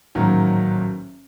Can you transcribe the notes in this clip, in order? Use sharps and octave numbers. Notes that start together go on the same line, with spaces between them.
A1 G#2 D#3 F#3 A#3